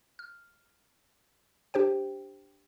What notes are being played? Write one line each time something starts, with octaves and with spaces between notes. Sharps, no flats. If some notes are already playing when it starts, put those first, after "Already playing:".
F6
D4 G4 C5 G5